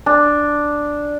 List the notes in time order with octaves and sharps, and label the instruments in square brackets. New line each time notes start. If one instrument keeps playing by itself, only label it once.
[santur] D4